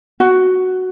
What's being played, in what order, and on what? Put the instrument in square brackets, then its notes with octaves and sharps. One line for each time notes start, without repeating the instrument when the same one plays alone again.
[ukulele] F#4